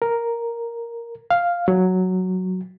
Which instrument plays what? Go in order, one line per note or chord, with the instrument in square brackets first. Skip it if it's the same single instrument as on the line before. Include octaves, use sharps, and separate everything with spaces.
[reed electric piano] A#4
F5
F#3